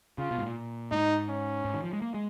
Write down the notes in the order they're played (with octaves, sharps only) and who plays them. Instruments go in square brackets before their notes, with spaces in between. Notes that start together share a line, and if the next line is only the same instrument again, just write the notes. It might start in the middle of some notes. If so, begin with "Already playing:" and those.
[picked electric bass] C#3 [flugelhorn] F4
[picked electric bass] B2
G#2
A#2
[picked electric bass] G#2 [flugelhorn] D#4
[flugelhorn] C#4
[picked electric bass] G#2
D#3
F3
G#3
A#3
G#3